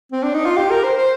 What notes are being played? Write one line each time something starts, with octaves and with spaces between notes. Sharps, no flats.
C4
D4
D#4
F4
G4
A#4
C5
C5